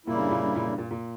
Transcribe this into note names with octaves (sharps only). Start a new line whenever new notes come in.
A#2 C#3 G3 A#3 E4
G2
A#2
G2
A#2
G2
A#2
A#2